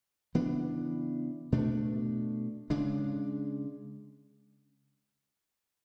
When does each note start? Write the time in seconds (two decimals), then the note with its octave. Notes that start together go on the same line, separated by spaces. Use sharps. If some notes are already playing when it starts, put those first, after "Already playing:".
0.35 C#3 E3 B3 D4
1.52 B2 A3 D4
2.70 C#3 G#3 D4